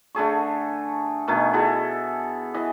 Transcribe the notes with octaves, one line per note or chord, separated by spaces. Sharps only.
D3 A3 G#4 C#6
B2 D#3 A3 G#5
E4 F#4 G#4 A4
E3 D#5